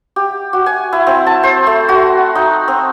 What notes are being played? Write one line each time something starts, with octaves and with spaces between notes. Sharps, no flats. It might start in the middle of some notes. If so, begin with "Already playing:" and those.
G4
F#4
G#5
E4
C4
A5
C5
A3
F#4
D#4
C4